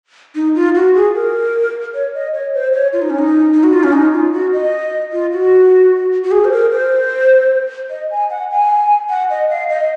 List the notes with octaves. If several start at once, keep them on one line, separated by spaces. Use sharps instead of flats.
D#4
F4
F#4
G#4
A#4
C#5
D#5
C#5
C5
C#5
F4
D#4
C#4
D#4
D#4
F#4
F4
C#4
D#4
F4
F#4
D#5
F4
F#4
F#4
G#4
C5
A#4
C5
D#5
G#5
F#5
G#5
F#5
D#5
F5
D#5